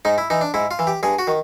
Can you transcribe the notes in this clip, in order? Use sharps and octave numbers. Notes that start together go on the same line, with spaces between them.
G#2 D#4
E4
E3 D#4
D4
G#2 E4
F4
E3
G4
G2 G#4
F#4
D#3